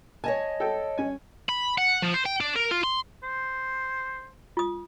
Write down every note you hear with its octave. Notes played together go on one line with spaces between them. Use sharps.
C#5 D#5 G#5 A5
A4 G5
C#4 G#5
B5
F#5
F3
C5
G5
D4
A#4
F4
C6
C5
F4 D#6